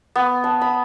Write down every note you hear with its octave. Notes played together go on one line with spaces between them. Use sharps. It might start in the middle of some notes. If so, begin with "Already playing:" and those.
B3
A5
B5